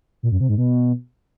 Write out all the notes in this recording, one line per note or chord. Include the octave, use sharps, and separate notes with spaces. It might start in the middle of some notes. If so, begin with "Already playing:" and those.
A#2
F#2
C3
G#2
B2